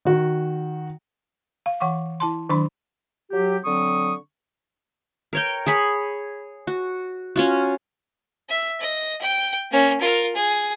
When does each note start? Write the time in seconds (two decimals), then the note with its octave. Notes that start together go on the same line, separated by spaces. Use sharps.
0.05 D#3 F#4
1.66 F5
1.80 E3 F#5 C#6 D6
2.20 E4 A5 C6
2.49 D#3 F#3 D4 B5 C6
3.31 F#3 G4
3.64 D3 F#3 C4 C#6 D#6
5.33 A#4 C#5 G5
5.66 G#4 C#5 B5
6.67 F#4
7.36 C#4 F4 F#4
8.49 E5
8.80 D#5
9.21 G5
9.71 A#3 C#4
10.01 F4 A#4
10.36 G#4